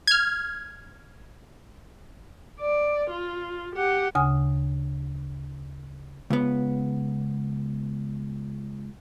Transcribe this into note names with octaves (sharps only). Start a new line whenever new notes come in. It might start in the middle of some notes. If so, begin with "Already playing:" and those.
F6 G#6
D5
F4
G4 F#5
D2 C#3 G#5 D#6
C#2 B3